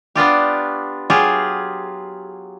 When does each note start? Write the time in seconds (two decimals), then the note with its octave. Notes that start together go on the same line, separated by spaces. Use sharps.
0.15 B3 D4 F4 G4
1.10 F#3 F4 G4 G#4